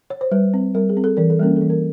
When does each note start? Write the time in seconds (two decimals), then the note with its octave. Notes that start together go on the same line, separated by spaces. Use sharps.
0.10 C#5
0.21 C5
0.31 G3 B4
0.54 C4
0.74 G3 A#4
0.89 G#4
0.97 C4
1.04 A4
1.17 E3 A#4
1.30 A4
1.39 G3 A#3 C#4 A#4
1.56 E3 A4
1.70 A#4